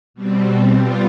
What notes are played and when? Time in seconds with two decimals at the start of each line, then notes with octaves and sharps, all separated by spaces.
0.14 B2 G3 C4
0.77 G3 B3 F4